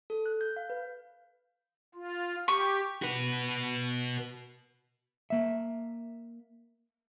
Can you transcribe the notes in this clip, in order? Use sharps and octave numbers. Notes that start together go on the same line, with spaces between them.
A4
F#6
G6
F5
B4
F4
G4 C#6
F#4 B4
A#3 E5